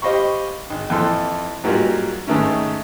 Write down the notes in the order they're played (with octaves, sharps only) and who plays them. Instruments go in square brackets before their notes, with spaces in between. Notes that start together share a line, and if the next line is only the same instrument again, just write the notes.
[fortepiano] G4 C5 D#5 F5 B5 C#6
G#1
F2 E3 A4 C6
G#2 F#3 G3 A#3 F4
G#2 D#3 A3 C#4